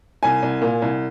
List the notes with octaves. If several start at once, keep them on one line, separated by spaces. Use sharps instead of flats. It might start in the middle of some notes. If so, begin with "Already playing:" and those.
C2 G#5
C2
A#2
C2